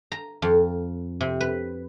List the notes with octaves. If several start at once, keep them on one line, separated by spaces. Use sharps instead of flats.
A#5
F2
C3
B4